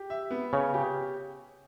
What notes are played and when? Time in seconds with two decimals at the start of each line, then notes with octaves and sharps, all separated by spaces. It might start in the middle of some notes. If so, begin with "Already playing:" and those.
Already playing: G4
0.10 E5
0.31 B3
0.53 C#3 C#5
0.74 G4